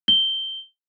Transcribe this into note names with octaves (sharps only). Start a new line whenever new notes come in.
G7